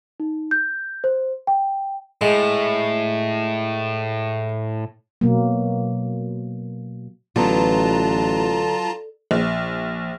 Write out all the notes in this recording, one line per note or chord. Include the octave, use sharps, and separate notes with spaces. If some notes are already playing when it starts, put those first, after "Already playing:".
D#4
G6
C5
G5
A2 G#3
B2 F#3 A#3
A1 D3 F#3 B3 F4 A5 A#5
A#1